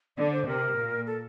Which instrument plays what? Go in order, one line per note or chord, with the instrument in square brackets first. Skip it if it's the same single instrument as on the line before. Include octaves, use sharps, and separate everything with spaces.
[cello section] D3 [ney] D5
[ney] C5
[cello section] C3 [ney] A#4
[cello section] A#2
[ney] A4